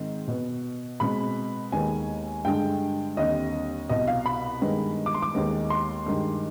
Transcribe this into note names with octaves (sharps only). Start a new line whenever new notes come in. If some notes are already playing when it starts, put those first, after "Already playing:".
Already playing: G#2 D#3 G#3 C4
B2 B3
B2 G#3 C4 B5
D#2 D#3 G#3 B3 G#5
G2 D3 G#3 G5
D#2 D3 G3 C4 D#5
C2 B2 G3 D#5
F5
B5
G2 D#3 G#3 B3
D6
C6
D6
D#2 D#3 G#3 B3
C6
G2 D#3 G#3